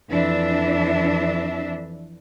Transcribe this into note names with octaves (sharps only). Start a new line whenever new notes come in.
F2 E3 D4 E5